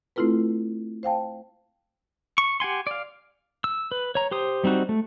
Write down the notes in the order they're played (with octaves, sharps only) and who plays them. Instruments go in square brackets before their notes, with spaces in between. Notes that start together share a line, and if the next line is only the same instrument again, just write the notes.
[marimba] A3 C4 E4 F4 A4 B4
C5 F5 G5 A5
[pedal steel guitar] C#6
G4 F#5 G#5 C6
D5 F5
E6
B4
C#5 A#5
G4 C5 D#6
G3 C4 D#4 F#4
A3